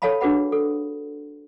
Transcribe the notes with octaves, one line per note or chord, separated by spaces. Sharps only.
A4 C#5 F5 A5 B5
D4 F#4 G#4 B4 F#5 B5
A4